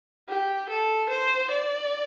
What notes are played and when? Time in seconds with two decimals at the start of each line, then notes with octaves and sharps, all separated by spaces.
0.29 G4
0.69 A4
1.10 C5
1.51 D5